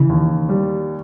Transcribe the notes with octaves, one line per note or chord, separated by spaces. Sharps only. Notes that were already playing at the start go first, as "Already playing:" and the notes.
Already playing: C#3 E3
D#2
G3